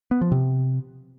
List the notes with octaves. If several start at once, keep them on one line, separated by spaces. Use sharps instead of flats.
B3
F3
C3